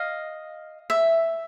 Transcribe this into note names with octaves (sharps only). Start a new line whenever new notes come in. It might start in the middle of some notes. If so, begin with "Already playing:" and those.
Already playing: D#5 F5
E5